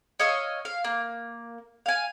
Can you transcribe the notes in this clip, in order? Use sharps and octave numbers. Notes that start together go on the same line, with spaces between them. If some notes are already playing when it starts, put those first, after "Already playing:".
C#5 D#5 F5 E6
F5
A#3
F5 G#5